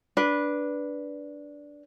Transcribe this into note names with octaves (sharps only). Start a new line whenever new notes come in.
D4 B4